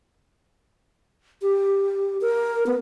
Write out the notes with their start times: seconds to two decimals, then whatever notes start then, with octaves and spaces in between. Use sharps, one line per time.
1.42 G4
2.21 A#4
2.66 B3